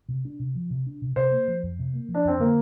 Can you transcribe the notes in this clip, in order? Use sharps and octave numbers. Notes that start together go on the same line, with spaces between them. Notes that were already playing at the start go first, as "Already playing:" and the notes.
C3
D4
C3
F3
C3
D4
C3
C3 C5
A#3
F3
F2
C3
A#3
F3
D4
F2 C4
D3 A#3